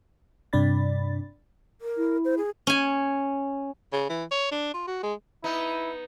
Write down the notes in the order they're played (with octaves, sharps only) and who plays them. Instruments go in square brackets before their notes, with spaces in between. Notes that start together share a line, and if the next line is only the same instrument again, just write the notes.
[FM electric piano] G2 C3 D4 D5 B5 A6
[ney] A#4
[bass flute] E4
[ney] C5
G#4
[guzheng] C#4 G#5
[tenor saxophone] C#3
E3
C#5
D4
F4
F#4
G#3
[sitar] B3 D#4 [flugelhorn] E4